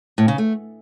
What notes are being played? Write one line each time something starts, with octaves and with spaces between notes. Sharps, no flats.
A2
C#3
A3